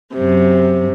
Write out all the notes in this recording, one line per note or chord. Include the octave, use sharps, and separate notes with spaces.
F#2 C3